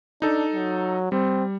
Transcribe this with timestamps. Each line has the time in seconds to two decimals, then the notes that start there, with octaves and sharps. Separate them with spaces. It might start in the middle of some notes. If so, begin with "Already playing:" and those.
0.22 D4 D#4 A4
0.54 F#3
1.12 G3 C4